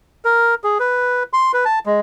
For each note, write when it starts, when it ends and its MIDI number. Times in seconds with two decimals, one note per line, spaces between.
0.25 0.55 70
0.64 0.78 68
0.80 1.23 71
1.33 1.52 84
1.54 1.65 71
1.65 1.79 81
1.86 2.00 56